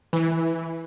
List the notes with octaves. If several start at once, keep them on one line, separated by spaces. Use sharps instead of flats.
E3